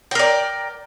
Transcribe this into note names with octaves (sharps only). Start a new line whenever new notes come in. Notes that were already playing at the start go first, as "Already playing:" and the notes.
A#4 D5 G5